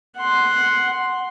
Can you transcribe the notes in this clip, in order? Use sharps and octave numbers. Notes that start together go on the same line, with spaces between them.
F#5 C6